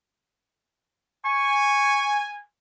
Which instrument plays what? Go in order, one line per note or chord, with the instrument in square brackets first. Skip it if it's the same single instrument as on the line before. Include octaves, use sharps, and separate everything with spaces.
[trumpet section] G#5 [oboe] C#6